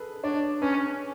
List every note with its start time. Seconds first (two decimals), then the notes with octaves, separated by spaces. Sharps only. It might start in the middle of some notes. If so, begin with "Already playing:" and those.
Already playing: G#4 A4 B4
0.24 D4 C#5
0.62 C#4 B4